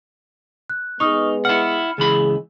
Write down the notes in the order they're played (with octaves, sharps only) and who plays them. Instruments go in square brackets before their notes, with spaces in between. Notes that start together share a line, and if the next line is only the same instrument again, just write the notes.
[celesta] F#6
[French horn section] G#3 B3 [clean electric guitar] D#4 [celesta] C#6 D#6 F6
[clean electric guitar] E4 F#5 [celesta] F6 C#7
[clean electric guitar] C#2 E3 B5 [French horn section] G#4